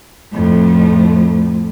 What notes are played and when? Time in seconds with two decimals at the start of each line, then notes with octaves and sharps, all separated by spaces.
0.32 F2 A2